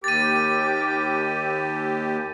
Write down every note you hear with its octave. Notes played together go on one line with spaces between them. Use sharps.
D#2 G4 A#4 G5 D6 A6 D#7